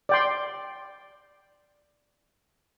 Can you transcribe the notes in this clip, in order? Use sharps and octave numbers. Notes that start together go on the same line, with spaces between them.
D5 G5 C6